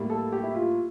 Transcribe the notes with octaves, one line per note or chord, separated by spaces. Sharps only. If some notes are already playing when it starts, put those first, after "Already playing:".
Already playing: A2 G3 A#3
A4
G4
E4
F4